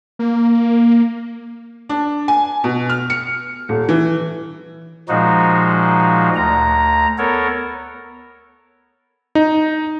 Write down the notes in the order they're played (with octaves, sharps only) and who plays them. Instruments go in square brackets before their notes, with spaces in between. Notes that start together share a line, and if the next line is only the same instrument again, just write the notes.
[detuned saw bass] A#3
[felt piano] D4
G#5
B2
F6
C#7
D#1
E3
[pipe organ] A#2 F3 G#3 D#4 F#4
D2 A#5
B3 A4 A#4 C#5
[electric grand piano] D#4